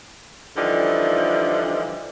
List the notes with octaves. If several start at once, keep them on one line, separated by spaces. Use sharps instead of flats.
D3 E3 F3 G3 D#4